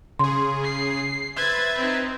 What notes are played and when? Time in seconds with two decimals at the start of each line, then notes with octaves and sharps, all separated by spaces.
0.19 C#3 G#4 C6
0.64 C7
1.36 B4 C5 E5 G#6 A6
1.78 C4 D#4